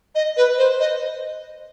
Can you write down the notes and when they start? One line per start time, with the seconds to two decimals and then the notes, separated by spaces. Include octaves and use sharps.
0.15 D#5
0.37 B4
0.58 C5
0.80 D#5